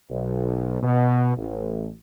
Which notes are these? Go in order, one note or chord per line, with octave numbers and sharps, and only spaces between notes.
B1
B2
A1